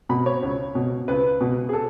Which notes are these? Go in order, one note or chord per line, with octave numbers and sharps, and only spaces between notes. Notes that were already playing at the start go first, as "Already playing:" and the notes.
B2 B5
C#5
C#2
B2
C#2 B4
B2
G#4
A4